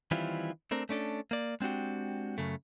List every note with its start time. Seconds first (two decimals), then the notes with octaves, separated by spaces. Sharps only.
0.11 D#3 E3 G3 C4 E4 F4
0.71 A3 C4 D4 A#4
0.89 A3 C#4 D4 A4
1.31 A#3 D5
1.61 G#3 C4 D4 F#4 G4
2.38 F#2 C#3 A3